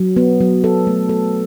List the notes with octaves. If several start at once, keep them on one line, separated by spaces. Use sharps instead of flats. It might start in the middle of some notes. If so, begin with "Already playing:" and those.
Already playing: F#3
B3
F#3
A4
A3
A4